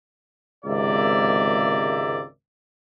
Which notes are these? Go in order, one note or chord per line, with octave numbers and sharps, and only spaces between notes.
G#1 C#2 C3 A#3 D5 E5